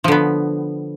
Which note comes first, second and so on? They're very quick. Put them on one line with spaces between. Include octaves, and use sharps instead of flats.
F3 D3 B3